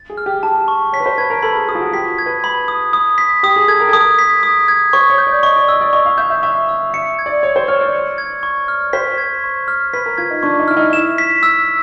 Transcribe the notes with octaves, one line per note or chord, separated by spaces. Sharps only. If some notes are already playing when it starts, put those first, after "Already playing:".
Already playing: A6
G#4
F6
G4
G4 A5
C#6
C#5 B6
B4
C5
B4 G#6
A#4
A4 B5
G#4
G#4 D#6
F4
F#4
G4 B6
G#6
B4
B5
D#6
D#6
B6
G4 D#6
G#4
A4 G#6
A#4
A4
A#4 D#6
B6
D#6
G#6
C5 C#6
C#5
G6
D5
D#5 C#6
D5
D#5 E6
D5
D#5 C#6
F5
E5 G6
E5
E5 C#6
E6
E5 C#7
G#6
D5
C#5 C#6
C5
C#5 F6
D5
C#7
G#6
C#6
F6
C5 B6
G#6
C#6
F6
B4 B6
A#4
F4 G#6
D#4
D4 C#6
D#4
E4 F6
D#4
E4 E7
B6
E6